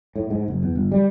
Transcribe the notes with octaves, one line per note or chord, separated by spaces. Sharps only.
A2
G#2
F#1
E2
G1
G3